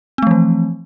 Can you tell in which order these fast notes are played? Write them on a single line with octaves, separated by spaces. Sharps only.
C4 A3 F3 E3